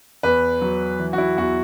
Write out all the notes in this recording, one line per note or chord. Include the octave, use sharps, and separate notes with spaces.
E2 B4
F#3
E3
F#4
E4
E2 F#4